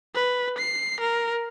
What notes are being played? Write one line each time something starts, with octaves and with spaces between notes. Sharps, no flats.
B4
C7
A#4